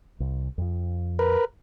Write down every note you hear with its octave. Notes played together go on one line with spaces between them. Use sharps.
C2
F2 F3
A#4 B4